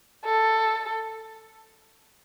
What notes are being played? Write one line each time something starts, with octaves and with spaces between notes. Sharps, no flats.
A4